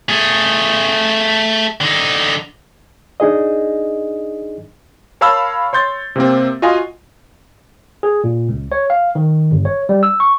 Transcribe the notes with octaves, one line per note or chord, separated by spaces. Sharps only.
A3 G#4
D3 D#4
D4 D#4 G#4 D#5
A#4 C#5 F5 A5 B5 E6
C#5 C6 G6 A6
C3 A#3 C4
F4 F#4 D#5 F5 G#5 C6
G#4
A#2
C#2
C#5
F5
D#3
G1
C#5
G3
E6
C#6